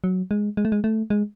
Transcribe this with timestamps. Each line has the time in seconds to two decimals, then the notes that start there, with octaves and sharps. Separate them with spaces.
0.04 F#3
0.31 G#3
0.57 G#3
0.65 A3
0.72 G#3
0.84 A3
1.10 G#3